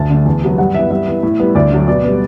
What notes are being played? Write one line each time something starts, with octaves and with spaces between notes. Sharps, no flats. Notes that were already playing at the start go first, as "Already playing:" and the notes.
Already playing: D2 A5
D3 A3
E2
C3 F#3 B3
G2 F#5
E3 B3 E5
G2 E5
E3 B3
A2
G3 B3
D2 D5
D3 F#3 A3
B2 D5
G3 B3